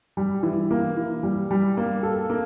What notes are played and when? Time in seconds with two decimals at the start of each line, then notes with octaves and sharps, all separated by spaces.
0.17 G3
0.43 E3
0.71 A#3
0.97 E3
1.23 G3
1.51 G3
1.77 A#3
2.03 A4
2.30 A#3